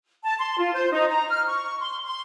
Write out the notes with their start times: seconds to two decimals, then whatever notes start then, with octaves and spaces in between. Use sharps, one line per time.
0.24 A5
0.39 C6
0.59 F4
0.73 C5
0.93 D#4
1.10 A#5
1.28 F6
1.46 C#6
1.80 C6
2.05 C6